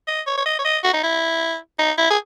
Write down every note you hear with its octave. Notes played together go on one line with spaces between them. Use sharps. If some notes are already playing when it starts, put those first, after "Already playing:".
D#5
C#5
C#5
D#5
C#5
D#5
F#4
D#4
E4
D#4
E4
G#4